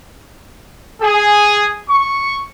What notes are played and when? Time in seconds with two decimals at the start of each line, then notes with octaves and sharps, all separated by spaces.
1.02 G#4
1.90 C#6